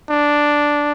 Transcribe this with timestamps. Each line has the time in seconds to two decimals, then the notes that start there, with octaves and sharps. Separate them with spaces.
0.10 D4